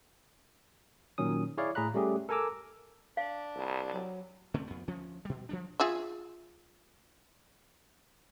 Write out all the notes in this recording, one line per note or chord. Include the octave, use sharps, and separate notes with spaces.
A#2 D#3 F#3 C#4 D#6
E4 G#4 C#5 D5 F5
A2 G#4 A#5 B5 F#6
G3 A3 C#4 G4 G#4
A4 A#4 G#5 A#5 D6 E6
D4 F5
C2
F#3
D3 A3 C4 C#4
F2 B3
D2 F3 C#4
B2 G3
F3 G3 D4
F4 G#4 E5